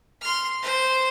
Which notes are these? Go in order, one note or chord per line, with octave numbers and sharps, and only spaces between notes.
C6 F6
C5